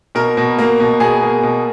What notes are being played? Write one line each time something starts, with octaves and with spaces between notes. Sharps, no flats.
B2 A#4
B2
A#3
B2
B2 G#4
A#3
B2